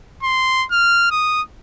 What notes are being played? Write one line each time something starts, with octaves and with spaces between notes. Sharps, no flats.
C6
F6
D#6